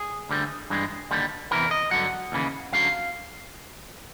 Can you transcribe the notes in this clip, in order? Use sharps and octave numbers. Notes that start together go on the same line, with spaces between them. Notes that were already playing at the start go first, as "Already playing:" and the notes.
Already playing: G#4
D2 D3 G3
G2 E3 G#3
D#2 D3 G3
E2 C3 E3 A#4
D#5
G2 D3 F#3 F#5
D#2 C#3 E3
F#2 D3 F#3 F5